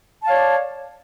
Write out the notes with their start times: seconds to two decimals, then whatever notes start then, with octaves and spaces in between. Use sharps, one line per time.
0.23 A5
0.26 F5
0.30 C#5
0.33 D5